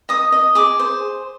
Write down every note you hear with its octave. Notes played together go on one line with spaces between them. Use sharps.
D#5 D#6
D#5
G#4 D6
C5